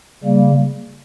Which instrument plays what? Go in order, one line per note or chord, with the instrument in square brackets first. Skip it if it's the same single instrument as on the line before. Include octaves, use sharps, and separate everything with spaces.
[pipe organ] C#3 G3 A#3